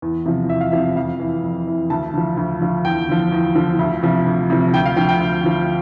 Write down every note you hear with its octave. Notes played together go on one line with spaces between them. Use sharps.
E2
C3 F3
E2 E5
F5
C3 F3 E5
F2 F5
E3
F2
E3
D2 A5
D3 F3
D2
D3 F3
E2 G5
D3 F3
E2
D3 F3
D2
C3 F3
D2
C3 F3
D2 G5
F5
D3 F3 G5
G5
D2
D3 F3